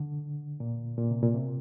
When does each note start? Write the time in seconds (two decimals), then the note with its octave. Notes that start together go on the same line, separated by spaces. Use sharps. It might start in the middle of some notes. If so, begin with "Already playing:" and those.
Already playing: D3
0.60 A#2
0.98 A#2
1.11 C3
1.23 A#2
1.35 C3